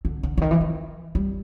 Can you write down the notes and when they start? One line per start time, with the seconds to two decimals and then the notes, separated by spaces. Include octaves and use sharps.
0.05 D3
0.23 D3
0.37 D3
0.41 D#3
0.51 E3
0.61 F3
1.15 G3